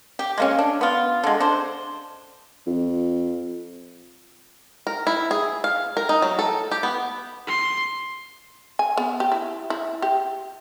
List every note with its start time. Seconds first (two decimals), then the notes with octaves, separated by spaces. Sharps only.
0.19 G4
0.38 G#3 A#3 C#4
0.59 D4
0.81 B3 F4
1.24 D3 G#3
1.40 D4 C5
2.66 F2
4.87 A#4
5.07 E4
5.31 G#4
5.64 F5
5.97 A#4
6.09 D#4
6.22 F#3
6.39 A4
6.71 G4
6.83 B3
7.47 C6
8.79 G#5
8.97 B3
9.20 G4
9.32 E4
9.70 E4
10.02 G4